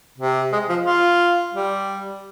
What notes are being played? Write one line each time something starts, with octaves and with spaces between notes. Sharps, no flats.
C3
G#3
F3
F4
G3